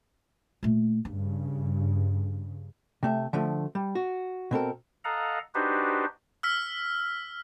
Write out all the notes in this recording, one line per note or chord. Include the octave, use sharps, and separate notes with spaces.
A#2 A3
G2 C#3 D4
C3 A3 E5
D3 F3 A3
G3
F#4
B2 C4 A4 A#4
A4 D#5 F5 F#5 A#5
D4 D#4 F#4 G4 B4 C5
E6 F6 B6